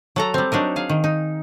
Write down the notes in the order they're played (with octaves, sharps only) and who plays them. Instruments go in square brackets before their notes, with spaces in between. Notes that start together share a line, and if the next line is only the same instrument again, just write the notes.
[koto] F#3 A4 A#5
G3 C4
F#3 D4 D#4 A#4
G#4 F5
D#3
D#4